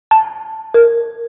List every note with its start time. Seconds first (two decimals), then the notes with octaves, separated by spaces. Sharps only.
0.11 A5
0.74 A#4